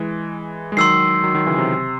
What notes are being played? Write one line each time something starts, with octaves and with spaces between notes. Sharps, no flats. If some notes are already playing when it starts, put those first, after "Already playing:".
Already playing: E3 G#3
G#3
D#3 F#3 C6 E6 C7
D#3 F#3
D#3 F#3
C#3 E3
C3